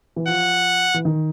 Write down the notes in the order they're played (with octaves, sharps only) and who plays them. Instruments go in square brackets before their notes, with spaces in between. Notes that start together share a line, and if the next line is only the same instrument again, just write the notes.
[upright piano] E3
[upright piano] F3 [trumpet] F#5
[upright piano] E3
D#3